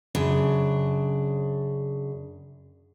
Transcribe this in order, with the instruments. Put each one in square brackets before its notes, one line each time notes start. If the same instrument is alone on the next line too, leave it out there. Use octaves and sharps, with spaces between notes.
[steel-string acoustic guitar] F#2 C#3 D4